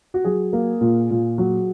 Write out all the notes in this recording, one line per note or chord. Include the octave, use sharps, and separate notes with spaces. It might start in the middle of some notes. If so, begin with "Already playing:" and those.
F#4
F#3 G#4
A#3
A#2
A#2
F#3